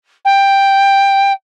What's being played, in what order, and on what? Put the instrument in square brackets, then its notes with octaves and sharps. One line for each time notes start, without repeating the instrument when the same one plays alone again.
[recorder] G5